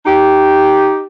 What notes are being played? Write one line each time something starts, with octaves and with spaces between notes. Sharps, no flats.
D#4 G4